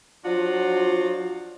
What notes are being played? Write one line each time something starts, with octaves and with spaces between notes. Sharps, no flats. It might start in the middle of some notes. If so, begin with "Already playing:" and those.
F3 F#3 D4 F4 F#4